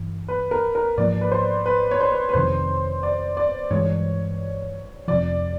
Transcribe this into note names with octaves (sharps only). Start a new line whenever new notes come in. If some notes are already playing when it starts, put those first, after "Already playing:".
Already playing: G2 E3
B4
A#4
A#4
G#2 F3 A#3 D5
B4
C5
B4
C#5
C5
B4
B4
F2 C3 D#3 C5
D5
D5
G2 E3 G#3 C#5
F2 C3 F3 D5